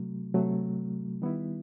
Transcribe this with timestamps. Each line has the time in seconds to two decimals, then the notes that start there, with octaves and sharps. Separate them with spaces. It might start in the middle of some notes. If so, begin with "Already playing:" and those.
Already playing: C3 F#3 A3
0.34 C3 F#3 A3
1.22 D#3 G3 B3 E4